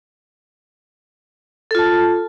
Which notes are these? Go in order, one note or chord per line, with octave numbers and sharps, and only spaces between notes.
F4 A4 A5